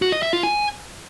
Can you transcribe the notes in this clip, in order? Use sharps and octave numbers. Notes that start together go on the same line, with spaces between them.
F#4
D#5
E5
F4
G#5